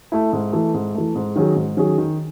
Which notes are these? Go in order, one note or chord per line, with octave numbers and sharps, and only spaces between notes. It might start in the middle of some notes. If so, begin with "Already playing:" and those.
A3 E4
G#2
E3 A3
G#2
E3 A3
G#2
D#3 F#3 C#4 G#4
G#2
D#3 F#3 C#4 G#4
D#3